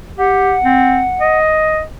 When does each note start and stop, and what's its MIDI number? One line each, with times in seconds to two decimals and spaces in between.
0.18 0.56 67
0.18 1.39 78
0.65 1.04 60
1.20 1.83 75